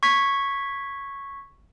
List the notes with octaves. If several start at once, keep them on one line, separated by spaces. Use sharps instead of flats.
C#6 G#6 B6